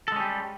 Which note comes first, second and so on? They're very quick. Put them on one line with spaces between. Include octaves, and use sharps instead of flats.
A4 G#3 C#4 G3